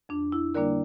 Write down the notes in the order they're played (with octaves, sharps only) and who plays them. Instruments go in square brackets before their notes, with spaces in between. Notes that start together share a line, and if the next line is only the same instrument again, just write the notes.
[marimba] F2 D4
E4
D3 G3 A#3 D4 A#4 D5